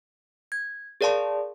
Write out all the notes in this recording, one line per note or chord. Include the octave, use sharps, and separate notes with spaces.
G#6
G#4 A#4 D5 F5 A5 C6